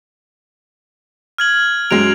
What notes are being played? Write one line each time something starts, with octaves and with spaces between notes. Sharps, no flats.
F6 G#6 F#7
F#2 F#3 G#3 D7 F7